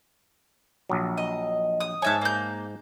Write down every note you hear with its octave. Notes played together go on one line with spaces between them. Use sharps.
A#1 F#3
D#5
D#6
G#2 C#5 E5 G#5 A5
A#3 G6